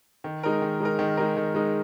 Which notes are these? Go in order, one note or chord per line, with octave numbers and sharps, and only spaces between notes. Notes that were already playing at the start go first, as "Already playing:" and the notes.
D#3
G#3 D#4 A#4
D#3
G#3 D#4 A#4
D#3
G#3 D#4 A#4
D#3
G#3 D#4 A#4